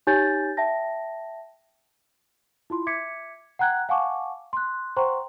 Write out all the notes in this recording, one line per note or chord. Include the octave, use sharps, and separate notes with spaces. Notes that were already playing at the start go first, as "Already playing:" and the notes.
D#4 G4 C#5 G#5 G6 A6
E5 G5 A5 A#6
E4 F4 C6
E5 D6 G#6 B6 C#7
F#5 G5 A#5 F#6 G#6
F5 F#5 G#5 A5 C#6 D6
C6 F#6
C5 F#5 G5 A#5 C6 C#6